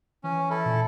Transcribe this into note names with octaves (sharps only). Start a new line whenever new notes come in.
E3 C#4
E4 A4
A#2